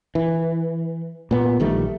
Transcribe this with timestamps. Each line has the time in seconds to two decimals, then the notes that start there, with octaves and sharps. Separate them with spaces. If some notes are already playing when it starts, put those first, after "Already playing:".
0.15 E3
1.31 A#2 B3
1.60 A#1 D#3 G3 A3